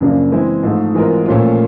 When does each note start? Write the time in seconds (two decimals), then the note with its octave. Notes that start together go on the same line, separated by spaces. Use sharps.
0.01 F#2 C#3 F3 A#3 D4
0.32 E3 G#3 C4 E4
0.63 G#2 F3 A3
0.94 E3 G#3 C4 F4 A#4
1.26 A#2 F3 A3 C#4 F4